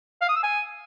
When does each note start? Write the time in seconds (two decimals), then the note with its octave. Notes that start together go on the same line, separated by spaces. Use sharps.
0.22 F5
0.29 D#6
0.36 E6
0.43 G#5